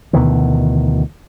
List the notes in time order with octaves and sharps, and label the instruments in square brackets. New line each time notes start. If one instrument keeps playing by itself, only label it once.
[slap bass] D2 B2 D#3 E3